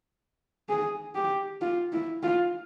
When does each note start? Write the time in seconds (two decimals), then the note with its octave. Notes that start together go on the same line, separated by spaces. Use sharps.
0.69 G#4
1.15 G4
1.61 F4
1.92 E4
2.23 F4